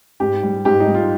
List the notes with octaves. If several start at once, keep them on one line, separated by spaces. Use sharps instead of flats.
G#2 G4
G3
G#2 G4
D#4
G3
F4